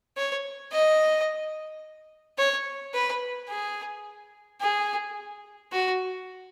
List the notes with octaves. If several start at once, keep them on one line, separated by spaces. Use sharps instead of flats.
C#5
D#5
C#5
B4
G#4
G#4
F#4